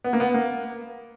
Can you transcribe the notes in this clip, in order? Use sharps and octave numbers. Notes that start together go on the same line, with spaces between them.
B3
A#3
B3
A#3